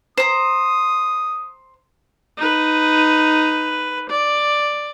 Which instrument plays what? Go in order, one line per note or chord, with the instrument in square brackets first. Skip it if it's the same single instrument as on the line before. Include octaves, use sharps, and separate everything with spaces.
[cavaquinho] C5 A#5 [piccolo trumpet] D#6
[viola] D#4 B4
D5